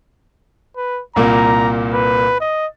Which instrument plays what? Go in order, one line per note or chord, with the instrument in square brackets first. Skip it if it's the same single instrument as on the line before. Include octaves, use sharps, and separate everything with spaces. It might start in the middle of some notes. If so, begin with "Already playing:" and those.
[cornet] B4
[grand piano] C2 A#2 A#3 [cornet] A#5
[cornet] B4
D#5